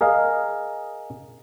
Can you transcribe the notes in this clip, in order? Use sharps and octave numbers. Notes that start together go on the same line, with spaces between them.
G#4 A#4 D#5 F5